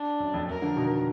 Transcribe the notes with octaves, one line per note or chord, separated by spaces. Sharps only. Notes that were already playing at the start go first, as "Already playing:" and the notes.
Already playing: D4
F#2
F2
F#2 A#4
D3 F3
B2 D#3